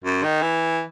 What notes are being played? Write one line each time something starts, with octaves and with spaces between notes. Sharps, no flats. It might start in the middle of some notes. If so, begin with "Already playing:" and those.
F#2
D#3
E3